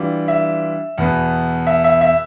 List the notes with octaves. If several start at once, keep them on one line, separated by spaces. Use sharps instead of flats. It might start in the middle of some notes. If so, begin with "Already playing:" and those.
Already playing: E3 G3 D4 F4
E5
E2 B2 B3
E5
E5
E5